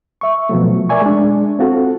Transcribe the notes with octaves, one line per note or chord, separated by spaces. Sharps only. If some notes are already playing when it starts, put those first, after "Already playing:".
E5 C#6
B2 F3 F#3 A3
A#4 D5 E5 G#5 C#6
G#3 D4
C4 F4 F#4 A4